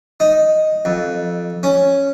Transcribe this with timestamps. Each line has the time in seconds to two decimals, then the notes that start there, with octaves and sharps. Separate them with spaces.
0.20 D#4
0.85 F2
1.63 C#4